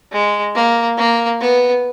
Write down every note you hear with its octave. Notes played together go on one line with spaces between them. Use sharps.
G#3
A#3
A#3
B3